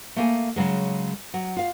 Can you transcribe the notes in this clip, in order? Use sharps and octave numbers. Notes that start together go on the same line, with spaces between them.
A3 A#3 G#5
C#3 F#3 G#3
F#3
F4 F5